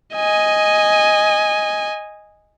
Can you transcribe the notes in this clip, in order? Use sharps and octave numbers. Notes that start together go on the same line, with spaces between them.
D#5 G#5